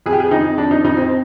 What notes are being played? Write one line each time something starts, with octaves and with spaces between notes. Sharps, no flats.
F2 G#4
G4
G#4
F2 D#4
F2 D4
D#4
F2 D#4
C4